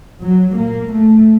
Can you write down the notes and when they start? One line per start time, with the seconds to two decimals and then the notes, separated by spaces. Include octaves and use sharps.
0.21 F#3
0.56 A#2 A#3
0.91 A3